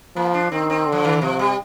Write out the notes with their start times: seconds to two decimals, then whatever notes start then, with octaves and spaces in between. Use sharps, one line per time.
0.16 F3 A#3
0.34 D4
0.52 D#3 C4
0.70 C4
0.87 D3
0.92 F3
1.04 D#3
1.22 C3 F3
1.39 G3